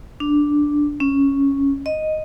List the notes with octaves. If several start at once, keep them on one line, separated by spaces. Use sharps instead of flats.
D4
C#4
D#5